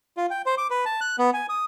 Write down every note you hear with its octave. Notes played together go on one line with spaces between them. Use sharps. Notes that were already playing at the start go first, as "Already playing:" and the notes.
F4
G5
C5
D6
B4
A5
F#6
B3
G#5
D#6